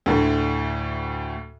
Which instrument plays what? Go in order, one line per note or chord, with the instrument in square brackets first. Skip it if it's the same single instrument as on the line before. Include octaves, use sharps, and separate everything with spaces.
[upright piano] D2 A2 D3